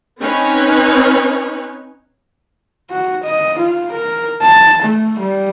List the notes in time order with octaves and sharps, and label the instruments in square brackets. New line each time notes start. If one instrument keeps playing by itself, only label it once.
[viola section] C4 C#4 D#4 B4 C#5
[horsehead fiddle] F#4
D#5
F4
A#4
A5
A3
G3